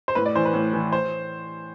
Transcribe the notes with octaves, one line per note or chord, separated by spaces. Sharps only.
C5
A2 B4
D5
E3 C5
B4
A2
E3
C5